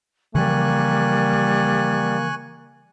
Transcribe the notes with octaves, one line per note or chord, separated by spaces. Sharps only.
C#3 E3 F3 G3 A#3 G#5 C#6 F#6